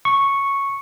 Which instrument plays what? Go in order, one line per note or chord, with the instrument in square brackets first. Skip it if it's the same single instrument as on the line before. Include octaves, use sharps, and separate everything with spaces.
[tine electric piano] C#6